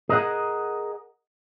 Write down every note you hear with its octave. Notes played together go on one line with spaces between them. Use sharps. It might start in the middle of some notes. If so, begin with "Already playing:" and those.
G#4 A#4 D#5 F5 F#5